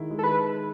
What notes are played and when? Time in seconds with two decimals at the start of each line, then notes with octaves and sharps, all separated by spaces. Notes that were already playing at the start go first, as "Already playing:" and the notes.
Already playing: D#3 G#3 E4
0.10 G#3
0.19 A4
0.24 B4